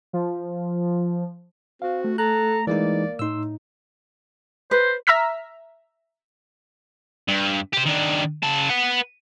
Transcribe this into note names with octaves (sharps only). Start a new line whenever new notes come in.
F3
C4 F#4 F5
A3
A4 A#5 F#6
E3 G#3 A#3 D#4 D5
A2 D#4 C6 E6
B4 C5
E5 A#5 E6 F6 B6
G2
G4 C5
D#3 D4
C#3 A5
B4 F#5